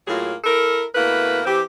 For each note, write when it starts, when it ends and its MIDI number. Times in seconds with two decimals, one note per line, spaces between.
0.07 0.34 45
0.07 0.34 54
0.07 0.34 58
0.07 0.34 65
0.07 0.34 68
0.44 0.84 64
0.44 0.84 69
0.44 0.84 70
0.95 1.40 47
0.95 1.40 57
0.95 1.40 58
0.95 1.40 64
0.95 1.40 71
1.46 1.62 52
1.46 1.62 60
1.46 1.62 67